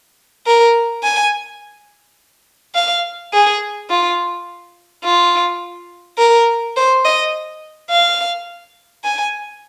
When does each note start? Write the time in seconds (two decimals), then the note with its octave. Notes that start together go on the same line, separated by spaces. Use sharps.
0.47 A#4
1.03 G#5
2.75 F5
3.33 G#4
3.90 F4
5.05 F4
6.18 A#4
6.77 C5
7.05 D#5
7.90 F5
9.04 G#5